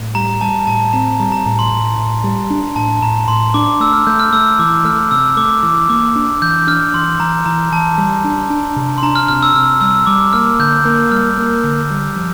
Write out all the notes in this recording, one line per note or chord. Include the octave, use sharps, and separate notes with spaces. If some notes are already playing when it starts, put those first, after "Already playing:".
Already playing: A2
G3 A#5
G3 A5
A2 A5
C4 A#5
G3 A#5
A#5
A2 A#5
C6
A2
A2
G3
D4
A2 A5
A2 A#5
A2 C6
D4 D6
A3 E6
F6
A3 G6
F6
A3 E6
E3 D6
A3 F6
C3 E6
A3 D6
E3 D6
A#3 D6
D4
E3 G6
D4 F6
E3 C6
E3 A#5
E3 A#5
E3 A5
G3
D4
D4
C3
C6
D4 A#5
F6
C3 F6
E6
C3 F6
G3 E6
G3 D6
A#3 F6
D3 G6
A#3
G3 F6
A#3
D3
G3
F3